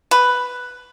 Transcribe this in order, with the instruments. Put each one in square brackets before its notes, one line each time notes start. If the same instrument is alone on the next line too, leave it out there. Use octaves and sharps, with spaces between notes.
[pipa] B4